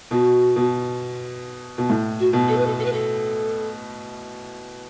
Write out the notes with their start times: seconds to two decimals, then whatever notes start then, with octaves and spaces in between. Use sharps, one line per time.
0.11 B2 F#4
0.56 B2
1.78 B2
1.90 A2
2.19 F#4
2.33 B2
2.48 A4
2.57 B4
2.66 A4
2.78 A4
2.85 B4
2.93 A4